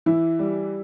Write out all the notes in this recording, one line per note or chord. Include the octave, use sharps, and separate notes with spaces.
E3 E4
G3